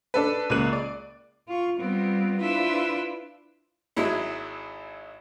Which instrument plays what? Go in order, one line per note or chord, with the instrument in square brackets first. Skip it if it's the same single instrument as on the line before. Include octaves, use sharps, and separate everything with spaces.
[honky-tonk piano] D4 A4 B4
C#2 A#3 F#6 D#7 F#7
D5
[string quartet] F4 C#6
G3 B3 C4 F4
D4 E4 F4 B4 C5 E5
[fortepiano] G#1 F#3 G#3 E4